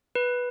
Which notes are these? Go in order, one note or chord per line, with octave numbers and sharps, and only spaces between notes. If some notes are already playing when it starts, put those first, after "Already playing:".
B4